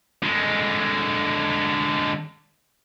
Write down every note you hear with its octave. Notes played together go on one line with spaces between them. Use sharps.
D3 G#3